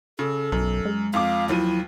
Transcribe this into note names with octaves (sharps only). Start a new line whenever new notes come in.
C#3 A4
B1 F#2
G#3
F2 F4 F5 D6
D#2 F3 F#3 E4 D#7